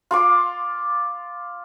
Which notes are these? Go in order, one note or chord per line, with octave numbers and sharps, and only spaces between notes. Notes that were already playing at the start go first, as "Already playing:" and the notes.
F4 C6 D6